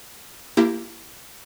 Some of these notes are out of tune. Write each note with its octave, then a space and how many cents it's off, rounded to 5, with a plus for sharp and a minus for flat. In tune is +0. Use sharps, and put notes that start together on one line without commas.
A#3 -10 E4 +25 G4 +0